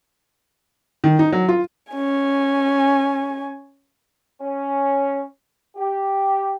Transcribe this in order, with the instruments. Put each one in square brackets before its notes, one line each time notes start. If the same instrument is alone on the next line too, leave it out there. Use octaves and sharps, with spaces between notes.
[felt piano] D#3
D#4
F#3
F4
[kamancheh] C#4 G#5
[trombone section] C#4
G4